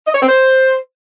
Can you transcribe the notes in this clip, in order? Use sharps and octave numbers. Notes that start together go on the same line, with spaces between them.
D#5
C#5
C4
C5